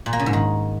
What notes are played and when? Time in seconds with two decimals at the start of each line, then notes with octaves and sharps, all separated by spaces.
0.06 A#2
0.13 A#3
0.20 C#3
0.26 G#2
0.33 D#3